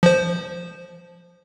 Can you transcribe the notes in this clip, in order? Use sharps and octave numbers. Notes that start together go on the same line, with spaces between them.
F3 C5